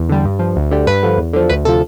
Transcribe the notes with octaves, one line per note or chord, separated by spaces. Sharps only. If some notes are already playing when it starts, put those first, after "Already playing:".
Already playing: E2
D3 G3
G2
F3
D2
D3 G3
G2 B4
D3 F3
E2
D3 F3
D2 B4
C3 F3 A4